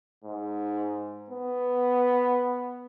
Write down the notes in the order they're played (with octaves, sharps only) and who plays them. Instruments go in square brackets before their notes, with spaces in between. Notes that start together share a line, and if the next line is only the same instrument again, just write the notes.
[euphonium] G#2
B3